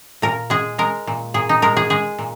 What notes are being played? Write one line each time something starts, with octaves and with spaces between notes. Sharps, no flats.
A#2 A#4
G#3 G#4
G#3 A#4
A#2
A#2 G#4
D#4
G#3 A#4
G#4
G#3 G#4
A#2